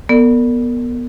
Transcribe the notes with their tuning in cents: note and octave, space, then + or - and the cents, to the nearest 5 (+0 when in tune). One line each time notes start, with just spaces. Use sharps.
B3 -15 A#4 -40 D5 +10